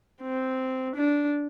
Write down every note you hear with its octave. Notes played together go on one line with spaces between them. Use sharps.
C4
D4